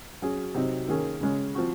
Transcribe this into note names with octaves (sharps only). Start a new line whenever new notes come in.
F#3 C#4 G#4
C3 F#3 C4 D#4
D#3 A#3 C#4 G#4
C#3 G#3 C#4
F3 C4 F#4